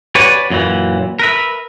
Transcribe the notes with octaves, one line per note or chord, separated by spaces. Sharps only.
G4 B4 C#5 D5 F#5 G#5
F#2 A#2 D#3 E3
A#4 B4 E5